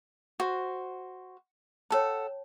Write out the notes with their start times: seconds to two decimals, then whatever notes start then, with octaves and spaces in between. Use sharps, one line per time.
0.40 F#4 C5
1.91 A4 C#5 F#5 G5 A5